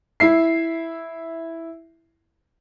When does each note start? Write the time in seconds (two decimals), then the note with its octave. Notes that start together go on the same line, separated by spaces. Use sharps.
0.20 E4 E5 C7